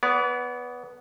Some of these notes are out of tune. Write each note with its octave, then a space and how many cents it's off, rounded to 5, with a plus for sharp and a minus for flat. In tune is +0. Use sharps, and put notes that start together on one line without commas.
B3 +0 D5 -40